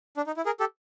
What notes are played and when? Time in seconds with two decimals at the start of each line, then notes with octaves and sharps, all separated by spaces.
0.17 D4
0.27 D#4
0.37 E4
0.46 G#4 A#4
0.60 G4 A4